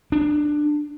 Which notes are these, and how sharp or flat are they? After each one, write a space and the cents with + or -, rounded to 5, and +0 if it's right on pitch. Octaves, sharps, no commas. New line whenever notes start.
D4 +15